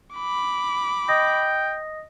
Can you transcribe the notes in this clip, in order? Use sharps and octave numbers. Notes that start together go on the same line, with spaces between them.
B5 D6
D#5 G5 D#6 A#6